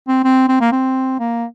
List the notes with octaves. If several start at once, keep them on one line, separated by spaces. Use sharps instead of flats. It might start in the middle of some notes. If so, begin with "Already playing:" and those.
C4
C4
C4
A#3
C4
A#3